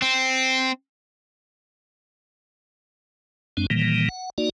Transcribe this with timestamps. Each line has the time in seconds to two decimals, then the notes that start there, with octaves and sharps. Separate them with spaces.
0.02 C4
3.57 F#2 G#3 C4 D4
3.70 A#2 D#3 E3 G3 A#3
4.09 F#5
4.38 A#3 D#4 F#4 D5